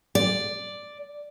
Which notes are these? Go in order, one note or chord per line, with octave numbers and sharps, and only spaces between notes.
D5